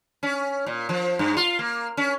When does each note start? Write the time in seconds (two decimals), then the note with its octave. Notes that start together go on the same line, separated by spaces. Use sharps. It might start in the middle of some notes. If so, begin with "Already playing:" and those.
0.23 C#4
0.66 A#2
0.89 F3
1.19 G2
1.37 F4
1.59 A#3
1.97 C#4